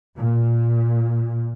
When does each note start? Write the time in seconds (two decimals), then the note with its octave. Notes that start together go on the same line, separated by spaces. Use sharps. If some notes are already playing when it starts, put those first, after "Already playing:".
0.18 A#2